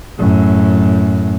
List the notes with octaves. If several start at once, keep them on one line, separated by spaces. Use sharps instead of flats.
F#2 A2